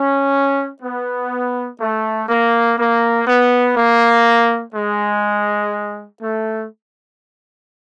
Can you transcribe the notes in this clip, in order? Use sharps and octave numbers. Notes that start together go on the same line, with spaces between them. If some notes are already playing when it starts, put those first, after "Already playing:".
Already playing: C#4
B3
A3
A#3
A#3
B3
A#3
G#3
A3